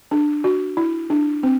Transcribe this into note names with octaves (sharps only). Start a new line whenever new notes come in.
D4
F#4
E4
D4
C4